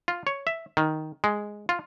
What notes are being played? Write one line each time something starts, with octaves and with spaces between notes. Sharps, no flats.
F4
C#5
E5
D#3
G#3
F4